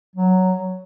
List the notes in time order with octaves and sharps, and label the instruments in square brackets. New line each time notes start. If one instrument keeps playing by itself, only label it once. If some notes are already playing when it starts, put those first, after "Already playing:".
[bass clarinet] F#3